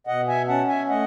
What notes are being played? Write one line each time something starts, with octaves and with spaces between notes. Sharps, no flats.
B2 D#5 F#5
E5 G#5
C#4 F#5 A5
E5 G#5
A3 D#5 F#5